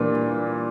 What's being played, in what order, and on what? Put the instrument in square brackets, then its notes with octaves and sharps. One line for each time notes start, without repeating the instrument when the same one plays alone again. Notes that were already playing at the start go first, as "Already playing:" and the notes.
Already playing: [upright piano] A#2 [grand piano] E3 G3 A#3 D4 F4